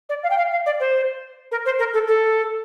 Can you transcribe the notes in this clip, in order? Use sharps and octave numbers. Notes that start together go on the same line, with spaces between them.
D5
F5
G5
F5
F5
D5
C5
A#4
C5
A#4
A4
A4